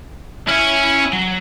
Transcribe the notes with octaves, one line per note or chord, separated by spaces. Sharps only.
C#4 E4 E5
F#3